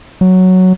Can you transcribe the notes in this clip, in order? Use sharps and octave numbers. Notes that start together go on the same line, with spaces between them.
F#3